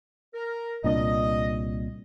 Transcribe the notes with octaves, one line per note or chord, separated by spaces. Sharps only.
A#4
C2 A#2 D4 D#5